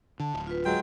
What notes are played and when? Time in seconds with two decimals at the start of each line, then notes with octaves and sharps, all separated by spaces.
0.20 D3 A5
0.34 D1
0.47 F4 B4
0.65 F#3 G#3 G5